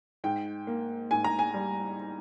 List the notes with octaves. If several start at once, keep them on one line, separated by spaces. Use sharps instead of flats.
G#2 G5
A#3
G#2 G#5
A#5
G#5
G3